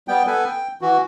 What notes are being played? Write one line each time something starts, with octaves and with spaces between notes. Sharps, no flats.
G3 B3 G5
B3 A4 B4 G#5
G5
E3 F#4